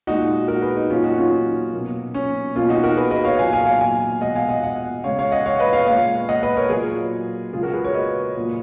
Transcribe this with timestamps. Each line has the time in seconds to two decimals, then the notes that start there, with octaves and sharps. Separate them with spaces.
0.07 A#2 G#3 D#4 F#4
0.48 F#4 A#4
0.62 G#4 B4
0.77 D#4
0.90 A#2 F#3 A#3 C#4 F4
1.04 D#4 F#4
1.18 C#4 F4
1.31 D#4
1.73 B2 F#3 A#3
2.14 C#4
2.56 B2 A#3 C#4 F4
2.69 D#4 F#4
2.83 F#4 A#4
2.97 G#4 B4
3.11 B4 D#5
3.24 C#5 F5
3.39 A#2 F#3 A#3 F5 G#5
3.53 F5 G#5
3.66 F5 G#5
3.80 F5 G#5
4.21 B2 G#3 D#5 F#5
4.36 F5 G#5
4.49 D#5 F#5
4.63 D#5 F#5
5.04 C#3 G#3 C#5 F5
5.19 C#5 F5
5.32 D#5 F#5
5.45 C#5 F5
5.59 B4 D#5
5.73 C#5 F5
5.87 A#2 G#3 C#5 F5
6.29 D#5 F#5
6.43 B4 D#5
6.57 A#4 C#5
6.70 A#2 F#3 A#3 F4 G#4
7.53 C#3 G#3 F4 G#4
7.63 F#4 A#4
7.73 G#4 B4
7.84 A#4 C#5
7.94 B4 D#5
8.35 A#2 F#3 A#3